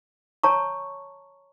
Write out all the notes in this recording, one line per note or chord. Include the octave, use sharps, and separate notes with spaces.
C#5 A5 A#5 C#6